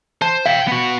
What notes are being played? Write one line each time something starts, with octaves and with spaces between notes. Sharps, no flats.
C5 A5
E5 F5 G5
B3 F#4